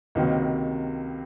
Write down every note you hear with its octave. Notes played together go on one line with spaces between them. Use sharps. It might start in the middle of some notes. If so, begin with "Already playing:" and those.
C#2 C3 D#3 F#3 A#3